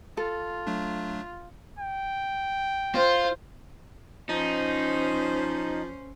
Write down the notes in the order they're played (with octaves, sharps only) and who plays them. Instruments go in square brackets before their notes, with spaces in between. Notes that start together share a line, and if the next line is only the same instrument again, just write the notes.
[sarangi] F4 [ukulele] A4
[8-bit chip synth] F#3 A3 D4
[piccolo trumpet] G5
[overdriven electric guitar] F4 [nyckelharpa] C5
[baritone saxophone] F3 [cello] C#4 C5 [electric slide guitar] D#4